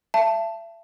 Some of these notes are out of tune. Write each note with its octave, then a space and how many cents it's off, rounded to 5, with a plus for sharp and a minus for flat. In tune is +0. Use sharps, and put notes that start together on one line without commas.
E5 +35 A5 +0